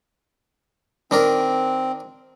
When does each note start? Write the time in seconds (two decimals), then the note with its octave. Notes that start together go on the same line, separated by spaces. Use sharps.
1.11 D#3 C4 D4 A#4